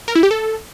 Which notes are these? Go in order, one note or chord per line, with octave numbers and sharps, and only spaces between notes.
A#4
E4
G4
A4